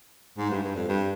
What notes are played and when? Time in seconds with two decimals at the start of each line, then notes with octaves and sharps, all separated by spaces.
0.38 G#2
0.50 G2
0.63 G2
0.75 F2
0.89 G2